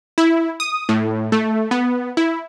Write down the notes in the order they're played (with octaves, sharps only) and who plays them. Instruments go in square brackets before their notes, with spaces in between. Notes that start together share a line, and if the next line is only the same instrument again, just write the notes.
[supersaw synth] E4
D#6
A2
A3
B3
E4